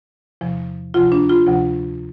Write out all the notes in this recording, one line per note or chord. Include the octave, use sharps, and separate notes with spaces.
E2 C3 F3
D2 C3 F3 F4
D4
F4
D2 C3 F3